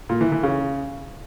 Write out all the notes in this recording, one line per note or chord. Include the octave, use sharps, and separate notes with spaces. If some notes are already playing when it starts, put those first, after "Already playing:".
A#2
E3
E3
C#3